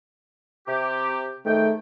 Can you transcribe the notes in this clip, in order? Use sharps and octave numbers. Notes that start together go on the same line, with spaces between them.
C3 G4
G#2 D#3 A3 G5